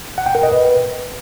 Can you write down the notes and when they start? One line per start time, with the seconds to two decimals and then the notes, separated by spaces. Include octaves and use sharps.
0.18 F#5
0.26 G5
0.35 A#4
0.43 D#5
0.52 B4